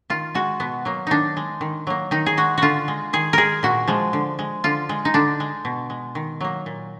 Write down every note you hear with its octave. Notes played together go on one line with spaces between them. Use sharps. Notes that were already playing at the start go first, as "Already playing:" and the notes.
D#3 F4
G#3 F#4
B2 B3
F#3 A#3
D#3 D4 D#4
G#3
D#3
F#3 A#3
D#3 D#4
G#4
G#3 F#4
D3 F4 F#4
G#3
D#3 G#4
G#3 G#4 A#4
A#2 F#4
F3 G#3
D3
G#3
D3 F4
G#3
D#4
D3 D4
G#3
B2
G#3
D#3
F#3 A#3
A#2